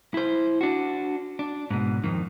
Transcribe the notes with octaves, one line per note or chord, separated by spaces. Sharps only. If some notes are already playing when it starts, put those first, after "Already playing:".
E4 C5
D4 F#4
D4
G#2 B2
F2 D#3